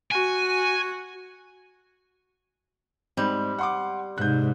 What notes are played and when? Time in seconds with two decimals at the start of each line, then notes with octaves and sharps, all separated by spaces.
0.12 F#4 G#5
3.17 G#2 G3 C4 G6
3.59 F#5 C6 D6
4.18 G#2 C3 F#6 G6